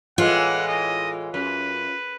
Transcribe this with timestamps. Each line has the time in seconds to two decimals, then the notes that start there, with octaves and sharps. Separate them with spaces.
0.18 A2 E3 G#3 F4 F#5
0.67 D#5
1.34 F#2 B4